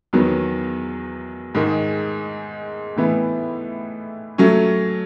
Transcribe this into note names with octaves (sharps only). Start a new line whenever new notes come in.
E2 D#3 F#3 B3
G#2 D#3 G#3
A2 E3 B3
F#3 A3 C#4